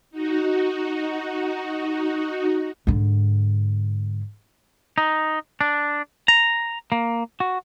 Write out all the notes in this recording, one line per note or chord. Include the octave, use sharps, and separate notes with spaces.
D#4 F#4
G#2 D3
D#4
D4
A#5
A#3
F#4